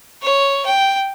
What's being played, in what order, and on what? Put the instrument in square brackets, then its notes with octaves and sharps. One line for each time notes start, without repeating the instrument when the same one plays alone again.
[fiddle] C#5
G5